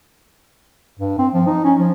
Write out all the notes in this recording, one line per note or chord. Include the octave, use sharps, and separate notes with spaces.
G2
C4
F3
D#4
C#4
F3